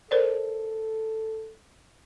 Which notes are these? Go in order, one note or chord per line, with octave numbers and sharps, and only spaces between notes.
A4 A#4 C5 D5